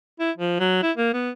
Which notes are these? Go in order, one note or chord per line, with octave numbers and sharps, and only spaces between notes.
E4
F3
F#3
E4
A#3
B3